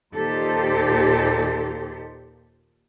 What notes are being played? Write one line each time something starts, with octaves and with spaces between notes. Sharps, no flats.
D#2 A#2 D#4 G4 A4 C5